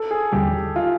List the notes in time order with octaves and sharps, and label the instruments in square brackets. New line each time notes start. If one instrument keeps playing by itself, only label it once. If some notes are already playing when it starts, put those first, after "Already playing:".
Already playing: [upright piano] A4
G#4
[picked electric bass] D#2 D3 G3 [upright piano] G4
[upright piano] F4